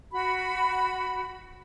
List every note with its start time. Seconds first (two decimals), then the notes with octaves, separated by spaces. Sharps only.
0.11 F#4 B5